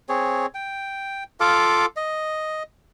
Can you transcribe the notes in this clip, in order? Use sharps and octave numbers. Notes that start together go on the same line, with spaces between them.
C4 G#4 C#5
G5
F4 A4 F5 D6
D#5